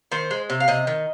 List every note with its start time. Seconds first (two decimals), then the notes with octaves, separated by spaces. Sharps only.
0.12 D#3 C5
0.31 G#3
0.50 C3
0.60 F5
0.68 C3 D#5
0.87 D#3